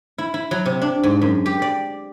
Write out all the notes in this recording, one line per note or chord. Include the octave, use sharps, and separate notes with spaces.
E4
E4
F#3
C3
D4
G#2
F#2
G4
D5